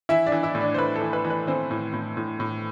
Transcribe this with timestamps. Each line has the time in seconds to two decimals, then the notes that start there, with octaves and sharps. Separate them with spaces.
0.09 E3 E4 E5
0.27 D4 D5
0.32 E3
0.43 E4 E5
0.55 A2
0.61 D4 D5
0.74 C5
0.78 A2 B4
0.96 A4
1.01 E3
1.13 B4
1.25 E3
1.30 B4
1.47 E3 C4 C5
1.71 A2
1.94 A2
2.17 A2
2.40 A2